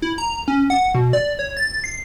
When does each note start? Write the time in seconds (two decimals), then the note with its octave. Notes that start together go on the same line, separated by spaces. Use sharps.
0.02 E4
0.18 A#5
0.48 C#4
0.70 F#5
0.94 B2
1.13 D5
1.39 C#5
1.57 A6
1.84 C7